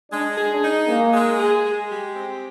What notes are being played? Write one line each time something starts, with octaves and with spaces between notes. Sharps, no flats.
G#3 D4
G#4
D4
D#4
G#3 A#3
G#3
G#4
G#3
G4
C4